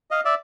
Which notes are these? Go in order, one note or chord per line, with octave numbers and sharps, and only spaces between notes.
D#5 F5
D5 E5